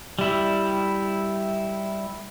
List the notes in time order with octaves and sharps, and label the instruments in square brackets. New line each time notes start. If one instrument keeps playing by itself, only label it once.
[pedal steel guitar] G3 E4